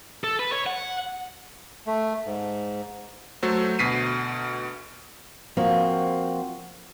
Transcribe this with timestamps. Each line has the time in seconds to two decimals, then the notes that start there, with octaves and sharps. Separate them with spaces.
0.24 A4
0.39 B4
0.52 C#5
0.66 F#5
1.87 A3
2.26 G#2
3.43 F#3 A3 F#4 A4 C5
3.79 D2 B2 B6 C7 D#7
5.57 F3 A#3 C4 F#4